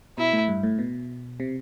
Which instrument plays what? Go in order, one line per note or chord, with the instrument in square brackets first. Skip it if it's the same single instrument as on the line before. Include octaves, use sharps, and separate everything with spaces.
[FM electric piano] B2 [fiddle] E4
[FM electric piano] A2
G2
A2
B2
C3